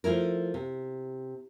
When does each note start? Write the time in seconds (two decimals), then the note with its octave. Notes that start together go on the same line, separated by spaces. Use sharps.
0.04 F3 A3 E4 A#4
0.54 C3